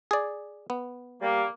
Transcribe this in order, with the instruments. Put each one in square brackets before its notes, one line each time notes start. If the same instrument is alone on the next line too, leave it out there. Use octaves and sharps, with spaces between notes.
[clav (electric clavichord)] G#4 D5
B3
[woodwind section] G3 A#3